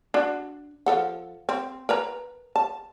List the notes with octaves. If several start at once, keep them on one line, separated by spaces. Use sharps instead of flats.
D4 F#4
F3 A4 F#5
C4
A#4 B4 A#5
A5